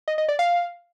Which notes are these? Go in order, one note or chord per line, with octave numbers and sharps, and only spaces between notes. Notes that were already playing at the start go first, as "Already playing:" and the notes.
D#5
D#5
D5
F5